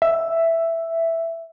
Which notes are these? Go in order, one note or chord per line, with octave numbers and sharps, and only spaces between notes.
E5